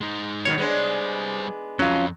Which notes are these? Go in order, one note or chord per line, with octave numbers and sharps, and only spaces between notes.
G#3 D#4
B2 D#3 F#3 C#5
G3 G#3 B3 D4 C5
F2 F#3 C#4 F4